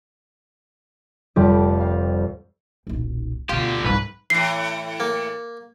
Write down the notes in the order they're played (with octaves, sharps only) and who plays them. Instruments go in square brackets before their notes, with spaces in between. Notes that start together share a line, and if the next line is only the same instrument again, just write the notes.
[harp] F1 F2 G3 F4 D6
F5
[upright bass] D#1 B1
[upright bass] D2 B2 [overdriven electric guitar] D3 G4 [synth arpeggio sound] F4
[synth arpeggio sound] C2 G#2 [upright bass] F3 G3 [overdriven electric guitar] B4
[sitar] A2 E3 [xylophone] C7
[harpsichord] A#3